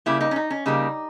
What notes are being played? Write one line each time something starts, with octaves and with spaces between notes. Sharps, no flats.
C#3 G3 A#3 E4
D#4
C#4
D#4
C#4
C#3 G3 A#3 D#4